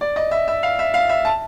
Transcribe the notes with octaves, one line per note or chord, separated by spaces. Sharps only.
D5
D#5
E5
E5
F5
E5
F5
E5
A5